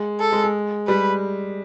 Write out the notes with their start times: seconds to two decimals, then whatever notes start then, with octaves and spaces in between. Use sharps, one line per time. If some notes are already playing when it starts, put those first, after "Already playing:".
Already playing: G#3
0.20 A4
0.32 G#3
0.43 G#3
0.87 G3 B4